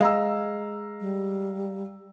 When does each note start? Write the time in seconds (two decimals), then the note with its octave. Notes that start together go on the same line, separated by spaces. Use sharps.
0.01 G#3 F5 A#5 E6
1.01 G3